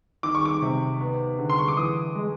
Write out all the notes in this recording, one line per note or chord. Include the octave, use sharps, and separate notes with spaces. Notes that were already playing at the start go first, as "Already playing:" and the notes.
D#3 D6
C#6
D6
C3
B3
D3
C6
C#6
D6
E3 D#6
G#3